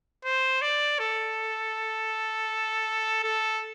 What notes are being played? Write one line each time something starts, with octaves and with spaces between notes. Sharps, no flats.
C5
D5
A4
A4